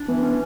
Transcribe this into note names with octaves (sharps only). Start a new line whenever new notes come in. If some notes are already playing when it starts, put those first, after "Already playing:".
Already playing: D4
E3 B3
B3 C#4